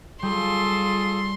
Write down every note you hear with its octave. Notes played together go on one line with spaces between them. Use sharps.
G3 F4 G#4 A4 C6